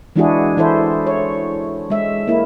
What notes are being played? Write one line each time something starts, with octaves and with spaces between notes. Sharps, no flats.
E3 G#3 D4 E4 F#4 G#4
E3 E4 A4 C5
C#5
G#3 E5
A#3 E4